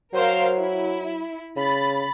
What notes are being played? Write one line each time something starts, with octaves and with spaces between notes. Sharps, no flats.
F#3 A#4 C5 F5
E4
C#3 B5 A6